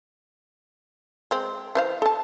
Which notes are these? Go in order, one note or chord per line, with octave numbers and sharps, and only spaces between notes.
G#3 C4
E3 C5 F5
A4 A5